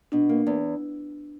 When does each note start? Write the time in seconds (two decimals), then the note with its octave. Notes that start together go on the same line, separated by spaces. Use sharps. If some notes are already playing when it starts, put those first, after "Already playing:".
0.12 B2 D4
0.29 A#3
0.47 E2